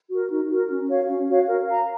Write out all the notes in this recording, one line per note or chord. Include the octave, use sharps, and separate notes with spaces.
F#4 A#4
D#4
F#4 A#4
C#4
F#4 C#5 F5
C#4
F#4 C#5 F5
A#4
F5 A#5